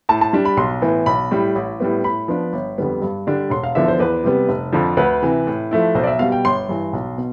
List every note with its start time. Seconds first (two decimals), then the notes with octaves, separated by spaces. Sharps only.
0.09 A2 A5
0.21 A5
0.33 G3 D4
0.45 B5
0.57 B1 C6
0.82 A2 E3 B3
1.06 B1 B5
1.31 A2 G3
1.55 A1
1.80 A2 G3 B3
2.04 A2 B5
2.28 F3 B3 D4
2.53 G1
2.78 F2 D3 G3 B3
3.02 G2
3.27 D3 G3 D4
3.50 E1 C6
3.63 F5
3.75 E2 D3 F3 B3 E5
3.88 C5
3.99 E2 B4
4.24 C3 G3 B3
4.49 F1
4.73 F2 D3 F3
4.97 D2 B4
5.22 C3 E3
5.47 A2
5.71 F3 A3 E4
5.95 B1 C5
6.03 D5
6.07 E5
6.19 B2 G3 F5
6.32 G5
6.45 G1 C6
6.69 G2 E3
6.93 B1
7.18 B2